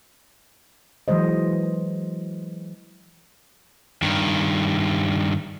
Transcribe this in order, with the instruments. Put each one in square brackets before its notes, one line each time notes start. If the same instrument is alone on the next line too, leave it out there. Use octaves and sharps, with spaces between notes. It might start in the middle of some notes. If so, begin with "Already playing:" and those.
[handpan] E3 F#3 G#3 C5 D#5
[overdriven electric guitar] G2 D#3